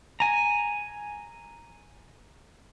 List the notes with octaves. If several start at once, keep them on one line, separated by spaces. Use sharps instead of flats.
G#5 A#5